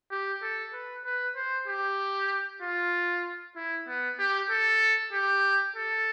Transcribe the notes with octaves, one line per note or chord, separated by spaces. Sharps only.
G4
A4
B4
B4
C5
G4
F4
E4
B3
G4
A4
G4
A4